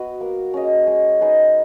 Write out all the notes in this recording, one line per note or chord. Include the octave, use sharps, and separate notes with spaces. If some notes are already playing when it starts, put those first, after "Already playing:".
Already playing: B3 F#4 B4 D#5
A#3
C#4 G#4 D#5
G#3
D#4 G#4 B4